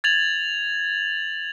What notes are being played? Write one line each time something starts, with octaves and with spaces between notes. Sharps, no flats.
G#6 A6 F7 F#7